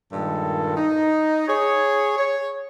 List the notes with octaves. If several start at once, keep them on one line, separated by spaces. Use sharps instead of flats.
G2 A#2 D#3 G#3 A4
D#4
G#4 C#5
C#5